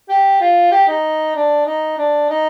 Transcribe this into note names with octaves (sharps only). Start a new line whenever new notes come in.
G4
F4
G4
D#4
D4
D#4
D4
D#4